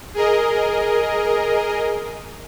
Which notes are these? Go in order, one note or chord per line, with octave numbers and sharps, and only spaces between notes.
G#4 A#4 D#5